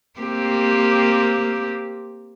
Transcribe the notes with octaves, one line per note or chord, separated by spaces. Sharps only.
A#3 C4 G4